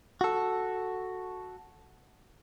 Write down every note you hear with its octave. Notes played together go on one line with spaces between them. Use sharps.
F#4 A4